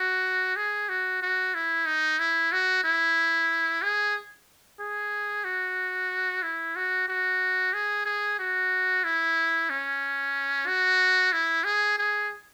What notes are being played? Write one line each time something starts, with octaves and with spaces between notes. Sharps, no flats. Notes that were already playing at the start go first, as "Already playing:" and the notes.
Already playing: F#4
G#4
F#4
F#4
E4
D#4
E4
F#4
E4
G#4
G#4
F#4
E4
F#4
F#4
G#4
G#4
F#4
E4
C#4
F#4
E4
G#4
G#4